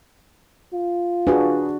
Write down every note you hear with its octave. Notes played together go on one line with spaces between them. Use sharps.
F4
D4 F#4 G#4 B4